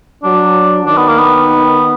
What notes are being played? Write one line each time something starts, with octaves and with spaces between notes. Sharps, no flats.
F#3 D4
D#3 D4
B3
A#3
B3